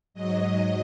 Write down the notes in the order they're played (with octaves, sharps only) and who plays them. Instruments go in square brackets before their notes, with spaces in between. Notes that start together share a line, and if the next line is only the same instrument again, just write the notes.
[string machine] G#2 F#3 D#5